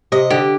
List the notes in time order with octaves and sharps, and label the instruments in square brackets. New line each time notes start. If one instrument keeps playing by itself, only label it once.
[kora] C3 [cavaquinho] D#5
[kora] D3 [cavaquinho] G4